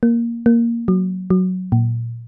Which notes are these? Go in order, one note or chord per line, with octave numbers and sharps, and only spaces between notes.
A#3
A#3
F#3
F#3
A#2